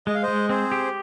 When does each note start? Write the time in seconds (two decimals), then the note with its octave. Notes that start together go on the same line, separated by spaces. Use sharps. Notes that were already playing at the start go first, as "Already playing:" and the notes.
0.07 G#3 D#5
0.15 F5
0.23 C5 D#5
0.28 G#3
0.49 C4 G#4 C5
0.72 G4